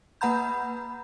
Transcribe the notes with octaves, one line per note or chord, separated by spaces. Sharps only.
A#3 B4 F#5 A#5 B5 G6